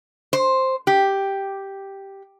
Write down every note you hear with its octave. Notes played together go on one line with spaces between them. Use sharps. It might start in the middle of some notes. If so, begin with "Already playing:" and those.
C5
G4